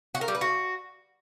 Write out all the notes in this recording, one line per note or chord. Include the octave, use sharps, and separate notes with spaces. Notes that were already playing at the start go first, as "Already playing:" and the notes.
F#4
A#4
G3
B4
F#4